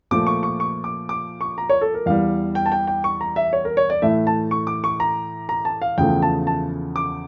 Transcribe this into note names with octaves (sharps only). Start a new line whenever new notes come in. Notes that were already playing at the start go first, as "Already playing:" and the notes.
A#2 F3 A3 D6
C#6
C#6
C#6
D6
D6
C#6
A#5
C#5
A4
A#4
E2 E3 G3 F5
G5
A5
G5
G5
C#6
A#5
E5
C#5
A#4
C#5
D5
A2 E3 A3 E5
A5
C#6
D6
C#6
A#5
A#5
A5
F5
E2 C#3 F3 A3 G5
A5
A5
D6